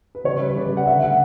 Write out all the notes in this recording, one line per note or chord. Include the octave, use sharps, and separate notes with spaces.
B4
C#3 C#5
G3 B4
C#3 D5
G3
F#5
D3 E5
A3 F#5